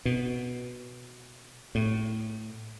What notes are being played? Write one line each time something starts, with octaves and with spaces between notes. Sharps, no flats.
B2
A2